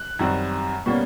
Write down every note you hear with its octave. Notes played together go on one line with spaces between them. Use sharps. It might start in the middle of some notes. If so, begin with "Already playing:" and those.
Already playing: F#6
F#2 D#3 G3 C4
B2 G3 A#3 C#4